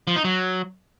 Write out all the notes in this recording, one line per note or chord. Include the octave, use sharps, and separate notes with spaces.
F3
D#4
F#3